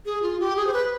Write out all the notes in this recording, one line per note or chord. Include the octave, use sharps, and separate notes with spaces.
G#4
F4
G4
G#4
C5
B4